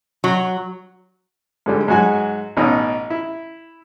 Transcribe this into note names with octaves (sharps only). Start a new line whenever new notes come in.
F#3
G#2 D3 G3
G#2 F#3 F#4 G#5
A1 B2 C#4 D#4
E4